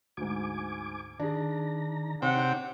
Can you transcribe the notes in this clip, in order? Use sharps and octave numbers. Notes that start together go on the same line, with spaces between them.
D2 G#2 G#5 D6
D#3 D4 G#4 A#5
C3 C4 D#4 C#5 F#5 G5